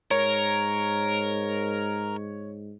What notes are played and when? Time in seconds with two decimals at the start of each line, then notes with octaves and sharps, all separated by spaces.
0.11 G#2 A#4 C#5